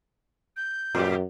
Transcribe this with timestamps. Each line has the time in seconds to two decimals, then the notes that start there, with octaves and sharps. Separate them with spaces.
0.57 G6
0.95 F#2 A2 G4